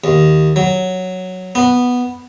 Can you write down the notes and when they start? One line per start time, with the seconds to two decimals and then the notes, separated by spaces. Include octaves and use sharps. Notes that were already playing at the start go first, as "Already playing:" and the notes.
0.04 D#2
0.56 F#3
1.55 B3